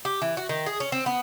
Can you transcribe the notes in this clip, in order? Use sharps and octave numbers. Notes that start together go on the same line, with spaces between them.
G4
E3
F#4
D#3
G#4
C#4
C4
B3